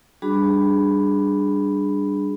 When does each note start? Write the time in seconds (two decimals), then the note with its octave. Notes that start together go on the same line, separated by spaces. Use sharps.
0.22 G3 D4 F#4 G#4 B5